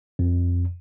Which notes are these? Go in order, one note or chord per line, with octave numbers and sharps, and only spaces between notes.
F2